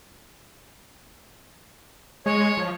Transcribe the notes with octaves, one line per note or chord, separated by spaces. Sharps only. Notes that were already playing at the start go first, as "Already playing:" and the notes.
G#3 C#5
F3